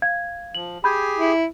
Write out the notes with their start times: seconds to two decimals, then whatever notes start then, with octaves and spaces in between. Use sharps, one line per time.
0.02 F5 G#6
0.55 F3 F#7
0.84 G4 G#4 G#5 B5 G6
1.18 E4